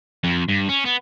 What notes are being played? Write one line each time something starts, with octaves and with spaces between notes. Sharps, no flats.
F2
G2
C#4
B3